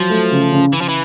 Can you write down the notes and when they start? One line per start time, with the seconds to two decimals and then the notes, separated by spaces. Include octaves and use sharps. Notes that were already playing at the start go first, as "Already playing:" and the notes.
Already playing: F3 F#3
0.10 A3
0.31 C#3
0.52 C#3
0.73 C#3 E3
0.81 F3
0.89 E3